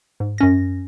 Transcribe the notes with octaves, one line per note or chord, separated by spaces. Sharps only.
G#2
F#2 C#4 A#6